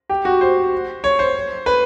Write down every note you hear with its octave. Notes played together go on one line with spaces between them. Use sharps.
G4
F#4
C5
C#5
C5
B4